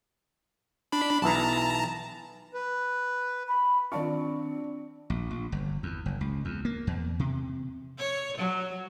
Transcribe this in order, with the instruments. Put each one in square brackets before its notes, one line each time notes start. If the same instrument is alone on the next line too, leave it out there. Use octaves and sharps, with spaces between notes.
[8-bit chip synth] D4 B5
[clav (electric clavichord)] B1 E3 [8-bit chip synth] A5 A#5
[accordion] B4
[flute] B5
[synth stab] D#3 F4 [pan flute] C4 [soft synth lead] D4 [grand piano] D5 A5 C#6
[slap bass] A#1
A#1
G1
E2
F#1
C#2
E2
A#3
E2
C3
[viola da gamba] C#5
F#3